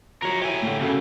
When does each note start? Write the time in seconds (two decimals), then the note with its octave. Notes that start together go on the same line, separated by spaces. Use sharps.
0.22 F3 F#3 A#4 C#5
0.42 E4 G4 C#5 G#5
0.62 A2 D3
0.81 B1 F#2 C#3 A4